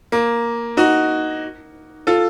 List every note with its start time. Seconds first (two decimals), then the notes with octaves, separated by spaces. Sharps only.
0.12 A#3
0.77 D#4 F#4
2.07 F4 A4